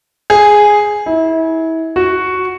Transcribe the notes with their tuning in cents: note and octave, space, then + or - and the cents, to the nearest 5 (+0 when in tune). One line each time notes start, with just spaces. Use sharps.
G#4 +0
E4 -30
F#4 +0